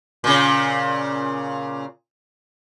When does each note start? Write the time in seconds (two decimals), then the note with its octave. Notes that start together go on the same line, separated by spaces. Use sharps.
0.24 A#2 C#3